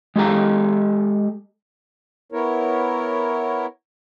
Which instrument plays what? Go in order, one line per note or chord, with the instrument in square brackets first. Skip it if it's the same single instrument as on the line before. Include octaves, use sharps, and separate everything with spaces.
[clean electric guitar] G#3 G4 A4 A#5
[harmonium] B3 E4 A#4 C#5